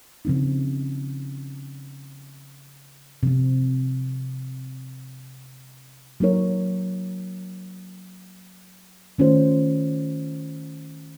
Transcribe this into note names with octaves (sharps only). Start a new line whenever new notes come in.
C#3 F3 C4 D#4
C3 F3 C4
F#3 A#3 D#4 A#4 C#5
D#3 A3 C#4 F4 C5